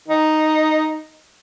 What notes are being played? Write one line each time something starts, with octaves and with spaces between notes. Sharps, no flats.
D#4